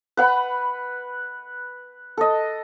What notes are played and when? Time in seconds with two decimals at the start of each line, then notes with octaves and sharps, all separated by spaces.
0.17 B4 F#5 B5
2.17 A4 D#5